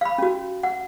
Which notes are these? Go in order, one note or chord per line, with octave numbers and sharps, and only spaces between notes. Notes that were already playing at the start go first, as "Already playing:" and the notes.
F5 B5
C#4 F#4
F#5